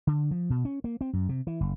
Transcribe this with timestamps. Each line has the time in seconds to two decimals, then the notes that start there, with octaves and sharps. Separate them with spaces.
0.07 D3
0.31 F3
0.50 B2
0.65 C#4
0.84 A#3
1.01 C4
1.13 F#2
1.29 C3
1.47 E3
1.60 F#1